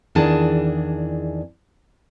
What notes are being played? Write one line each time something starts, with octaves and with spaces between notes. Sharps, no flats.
E2 D#3 E3 D4 G#4 A5